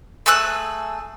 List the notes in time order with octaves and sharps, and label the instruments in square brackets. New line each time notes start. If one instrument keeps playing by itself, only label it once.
[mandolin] A3 G#4 E6 F#6